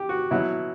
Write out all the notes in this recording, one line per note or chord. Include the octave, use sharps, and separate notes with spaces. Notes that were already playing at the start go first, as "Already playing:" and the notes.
Already playing: G4
F#4
B2 F#3 E4